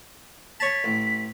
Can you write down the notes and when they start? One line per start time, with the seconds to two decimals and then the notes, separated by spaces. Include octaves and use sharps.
0.60 C#5 A5 B6
0.84 A1